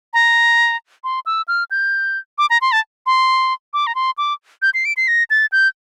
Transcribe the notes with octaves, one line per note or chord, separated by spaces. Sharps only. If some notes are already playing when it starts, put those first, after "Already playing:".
A#5
C6
E6
F6
G6
D6
A#5
C6
A5
C6
D6
A#5
C6
D6
G6
C7
D7
C7
A#6
A6
G6